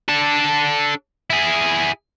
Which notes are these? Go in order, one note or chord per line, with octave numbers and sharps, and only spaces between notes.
D4 A4
E4 G#4